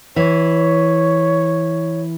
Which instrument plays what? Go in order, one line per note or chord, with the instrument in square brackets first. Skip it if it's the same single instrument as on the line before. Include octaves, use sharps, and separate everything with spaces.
[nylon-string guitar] E3 [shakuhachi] C#5